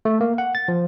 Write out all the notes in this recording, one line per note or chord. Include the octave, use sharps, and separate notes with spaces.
A3
A#3
F#5
A6
F3